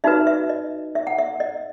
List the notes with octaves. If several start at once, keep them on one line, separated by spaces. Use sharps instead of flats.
D#4 F#4 B4 E5
E5
D#5
E5
F#5
E5
D#5